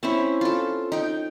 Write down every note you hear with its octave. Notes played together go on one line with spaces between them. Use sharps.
C4 C#4 E4
F4 A4
D#4 G5